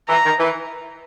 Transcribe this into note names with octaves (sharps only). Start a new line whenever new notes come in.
E3 A#5
D#3
E3